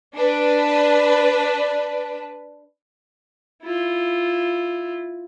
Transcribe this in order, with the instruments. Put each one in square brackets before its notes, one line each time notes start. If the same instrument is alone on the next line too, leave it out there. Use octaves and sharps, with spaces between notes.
[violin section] D4 B4
[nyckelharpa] E4 F4